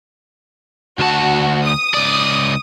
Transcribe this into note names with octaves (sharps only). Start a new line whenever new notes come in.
D2 F#4 A5
D#6
C#2 D5